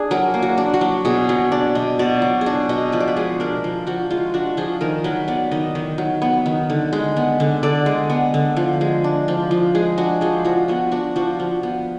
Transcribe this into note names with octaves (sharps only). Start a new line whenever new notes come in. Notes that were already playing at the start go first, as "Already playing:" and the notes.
Already playing: D4 G#4
F#3 A#4
A#3
F#4
D4
F#4
F#3
B2 G#4
F#3
D4 D5
B2 D#5
B2 D5
F#3
G#4
D4 F#4
B2 D#5
F3 B4
D5
B4
G#3 G#4
D4 A#4
F3
F3 F#4
G#3 F4
D4 F#4
F3 G#4
D#3 A#4
F#3 B4
B3 D5
D#3 D#5
D#3
F#3
B3
D#3
D3
G#3
B3
D3
D3 D5
G#3
B3
D3
F3
G#3
D4
F3
F3
G#3 G#4
D4 F#4
F3 G#4
F3 F#4
B3 F#4
D4 F#4
F3 F#4
F3
B3